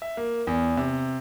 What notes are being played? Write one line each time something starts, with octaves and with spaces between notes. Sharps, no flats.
E5
A#3
E2
C3